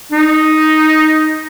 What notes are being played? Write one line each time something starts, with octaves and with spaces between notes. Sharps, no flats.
D#4